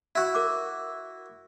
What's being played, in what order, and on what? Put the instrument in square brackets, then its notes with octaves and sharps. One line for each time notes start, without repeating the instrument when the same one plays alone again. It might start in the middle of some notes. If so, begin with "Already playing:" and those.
[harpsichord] E4 F#4
[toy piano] A#4 D6